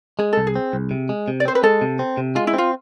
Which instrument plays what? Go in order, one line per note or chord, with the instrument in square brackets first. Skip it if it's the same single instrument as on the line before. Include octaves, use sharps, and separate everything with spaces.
[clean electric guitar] G#3 [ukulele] G#4
[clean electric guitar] C2 [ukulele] A4
[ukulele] G#4
[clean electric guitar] C4
C2
C3
G#3
C3
[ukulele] D5
[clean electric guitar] C4 [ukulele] C5
[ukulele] B4
[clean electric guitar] G#3 [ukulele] A4
[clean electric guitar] C3
C4
C3
[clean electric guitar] G#3 [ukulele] F4
[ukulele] E4
[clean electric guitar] C4 [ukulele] F4